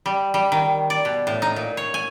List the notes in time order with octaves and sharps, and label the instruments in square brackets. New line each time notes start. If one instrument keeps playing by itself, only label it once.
[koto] G3
G3
D#3
D5
B2
A2
D#4
A#2
C#5
G#5